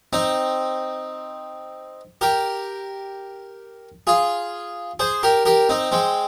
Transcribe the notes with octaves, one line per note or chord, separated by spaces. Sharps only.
C4 D#4
G4 A#4
F4 G#4
G#4 C5
G4 A#4
G4 A#4
C4 D#4
G#3 C4